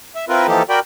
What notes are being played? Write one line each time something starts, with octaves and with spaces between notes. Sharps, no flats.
E5
C4 E4 F4 A#4 B4
E3 F3 A#3 D#4 G4 A4
F#4 A#4 D5 G5 B5